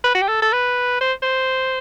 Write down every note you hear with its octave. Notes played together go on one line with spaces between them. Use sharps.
B4
F#4
G4
A4
A4
B4
C5
C5